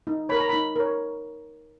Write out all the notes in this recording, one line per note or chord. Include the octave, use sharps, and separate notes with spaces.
D#4
A#4 C#5 B5
A#5
D#4 B5
A#4 C#5